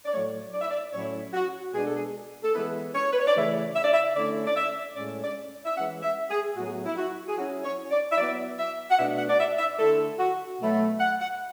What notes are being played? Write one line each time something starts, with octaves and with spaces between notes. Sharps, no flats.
D5
A2 F#3 A3 C#5
D5
E5
D5
A2 F#3 C#4 E4 C#5
F#4
B2 G#3 D4 G#4
A4
G#4
A4
E3 G#3 B3 E4 B4
C#5
B4
C#5
D5
C#3 E3 A3 E4 E5
E5
D5
E5
D3 A3 C#4 E4 D5
D5
E5
A2 G#3 C#4 D5
D5
E5
E3 G#3 C#4 F#5
E5
G#4
A2 F#3 B3 F#4
G#4
F#4
E4
F#4
G#4
F#3 C#4 E4 F#4
C#5
D5
E5
F#3 B3 E4 D5
E5
F#5
B2 A3 D4 E5
F#5
D5
E5
E5
D3 A3 E4 A4
F#4
B2 F#3 A3 E4
F#5
F#5